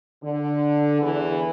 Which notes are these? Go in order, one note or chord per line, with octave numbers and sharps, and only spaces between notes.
D3
E2 E3